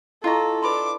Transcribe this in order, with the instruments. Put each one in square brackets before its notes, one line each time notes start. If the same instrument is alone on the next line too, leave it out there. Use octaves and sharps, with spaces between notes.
[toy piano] E4 D#5 C#6 [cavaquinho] F4 A#5 [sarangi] A4
[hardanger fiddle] D4 D6 [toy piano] B4 B5 C6